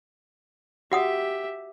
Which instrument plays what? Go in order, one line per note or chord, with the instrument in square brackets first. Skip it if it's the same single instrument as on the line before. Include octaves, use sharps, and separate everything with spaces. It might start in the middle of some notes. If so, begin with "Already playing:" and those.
[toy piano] F#4 F#5 D#6 [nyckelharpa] G4 E5